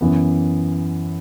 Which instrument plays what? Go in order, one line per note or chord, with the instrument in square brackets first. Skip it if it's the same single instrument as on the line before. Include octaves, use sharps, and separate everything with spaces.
[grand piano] F#2 E3 B3